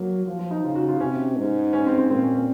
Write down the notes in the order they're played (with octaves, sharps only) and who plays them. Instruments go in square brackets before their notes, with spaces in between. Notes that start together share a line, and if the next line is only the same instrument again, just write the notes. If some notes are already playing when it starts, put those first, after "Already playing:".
Already playing: [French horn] F#3 [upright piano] A#3
[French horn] F3 [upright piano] F4
[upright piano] F4
D#4
[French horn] C#3 [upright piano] F4
[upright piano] F#4
F4
[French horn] C3 [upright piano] C#4
[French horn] G#2
[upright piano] C#4
C4
C4
[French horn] A#2 [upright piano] C4
[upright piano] C#4
C#4